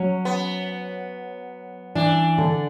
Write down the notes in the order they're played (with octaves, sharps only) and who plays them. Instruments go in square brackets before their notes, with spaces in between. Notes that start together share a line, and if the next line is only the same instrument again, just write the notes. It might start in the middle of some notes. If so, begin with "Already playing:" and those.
Already playing: [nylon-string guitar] F#3 [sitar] C#4
[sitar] B3
[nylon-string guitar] E3 [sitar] D4
[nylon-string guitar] D3